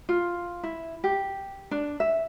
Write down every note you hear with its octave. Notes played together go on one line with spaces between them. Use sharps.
F4
E4
G4
D4
E5